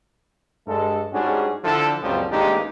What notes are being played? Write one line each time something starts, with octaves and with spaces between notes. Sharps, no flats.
G2 G#3 A4
G#2 G3 C#4 D4 F#4 G#4
D3 F3 D4 E4 A4
C#2 F#2 A#2 F3 G3 C4
A1 G#3 A#3 D4 D#4 G4